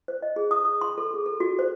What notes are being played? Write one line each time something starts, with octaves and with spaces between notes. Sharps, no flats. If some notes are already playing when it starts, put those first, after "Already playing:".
C5
D#5
G#4
D#6
D#6
C6
A4
G#4
A4
F#4
C5